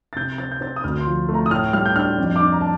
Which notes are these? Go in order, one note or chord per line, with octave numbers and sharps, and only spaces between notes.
A6
C3 G6
C4 A6
G6
C4 A6
D#6
D2 F6
C6
F3
A3
A#5
D#6
A2 F6
G3 F6
G6
D4 F6
F2
D4 D6
A#5
A5